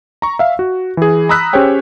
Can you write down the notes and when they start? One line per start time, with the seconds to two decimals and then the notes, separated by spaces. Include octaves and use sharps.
0.22 A#5 C#6
0.39 E5 F5
0.59 F#4
0.97 E3 G#4
1.29 A#5 B5 D#6 E6 F#6 B6
1.53 C#4 G4 G#4 C5 C#5 G5